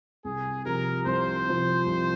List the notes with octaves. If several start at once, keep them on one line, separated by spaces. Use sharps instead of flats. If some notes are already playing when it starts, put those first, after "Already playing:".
C2 G#4
C3 F3 A#4
C2 C5
C3 F3
C2